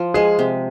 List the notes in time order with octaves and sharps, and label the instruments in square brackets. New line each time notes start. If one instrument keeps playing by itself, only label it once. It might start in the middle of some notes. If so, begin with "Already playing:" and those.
Already playing: [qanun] F3
[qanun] G#3 [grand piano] G#4
[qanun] C3